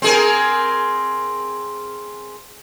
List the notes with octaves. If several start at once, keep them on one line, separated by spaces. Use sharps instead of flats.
C4 G#4 A#4